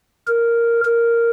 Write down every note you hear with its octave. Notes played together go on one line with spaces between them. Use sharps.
A#4
A#4